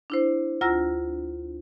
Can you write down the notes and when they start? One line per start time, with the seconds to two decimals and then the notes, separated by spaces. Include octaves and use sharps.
0.10 D4 E4 C5
0.61 D2 F4 A#5 E6 A#6